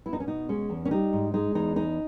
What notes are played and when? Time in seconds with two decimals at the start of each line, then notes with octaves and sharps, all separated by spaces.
0.06 B3 E4
0.13 D#4
0.20 C#4
0.27 B2 D#4
0.49 G#3 C#4
0.70 E2
0.85 C#4
0.91 G3 D#4
1.13 G#2
1.34 G#3 D#4
1.55 E2 D#4
1.76 C#4 D#4